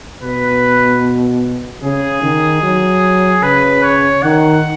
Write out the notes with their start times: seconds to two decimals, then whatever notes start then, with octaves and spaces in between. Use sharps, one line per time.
0.23 B2 B4
1.83 C#3 G#4
2.23 D#3
2.63 F#3
3.43 C#3 B4
3.83 C#5
4.23 D#3 F#5